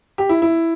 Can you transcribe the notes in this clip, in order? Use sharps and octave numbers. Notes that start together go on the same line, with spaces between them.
G4
E4
E4